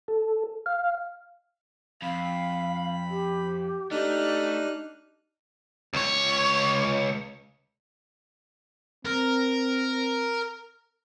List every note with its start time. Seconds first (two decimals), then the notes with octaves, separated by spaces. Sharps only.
0.08 A4
0.66 F5
2.02 F2 F5 B5
3.10 G4
3.91 A3 D4 D#4 G4 F6 F#6
5.93 C#2 C#5
9.05 C4 A#4